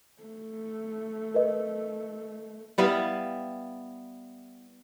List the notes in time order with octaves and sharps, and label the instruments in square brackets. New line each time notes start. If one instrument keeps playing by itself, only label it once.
[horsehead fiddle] A3
[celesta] A#4 B4 D#5
[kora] G3 B3 E4 F5